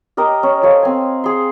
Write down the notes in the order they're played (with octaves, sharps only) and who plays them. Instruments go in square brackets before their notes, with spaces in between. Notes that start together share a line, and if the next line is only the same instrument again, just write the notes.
[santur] G4 A#4 D#5
C#4
A4 C5 C#5 F5
C4 G#5
G#4 C6